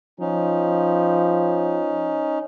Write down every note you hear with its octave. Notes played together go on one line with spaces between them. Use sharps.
F3 C#4 D#4